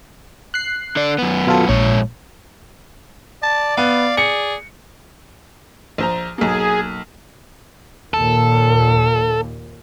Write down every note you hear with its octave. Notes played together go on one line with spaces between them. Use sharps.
F#6 C7
D3 D5
F#2 B3
B2 F4 A4
A#1 G#2 C#5
D5 A5
B3 F5
G#4 C#7
A#1 C5 A#5
B1 A#3 G#4
D#2 A#2 A4